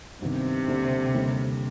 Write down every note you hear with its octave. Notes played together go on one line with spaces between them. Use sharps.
G2 C3 D#3 B3
D#2 D3 G3 D4
D#2 D3 G3 C4